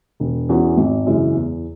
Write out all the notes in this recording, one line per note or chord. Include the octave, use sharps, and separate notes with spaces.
E1
E2 E3 C#4 F#4
G#1
F#2 C#3 E3 G#3
E2